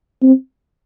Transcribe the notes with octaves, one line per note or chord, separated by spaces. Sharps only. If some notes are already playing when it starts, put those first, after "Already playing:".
C4